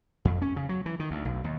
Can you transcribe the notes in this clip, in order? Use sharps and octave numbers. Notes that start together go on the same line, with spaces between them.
F2
C#4
C#3
F#3
E3
D#3
D2
B1
D#2